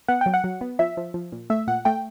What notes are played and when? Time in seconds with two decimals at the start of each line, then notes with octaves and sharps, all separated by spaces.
0.08 B3 F#5
0.21 F#3 G5
0.34 F#5
0.44 F#3
0.61 B3
0.79 F3 E5
0.97 F3
1.14 F3
1.32 A#2
1.50 A3 E5
1.68 A#2 F#5
1.85 A3 G5